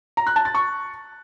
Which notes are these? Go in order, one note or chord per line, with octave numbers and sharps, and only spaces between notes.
A#5
F#6
A5
A6
C#6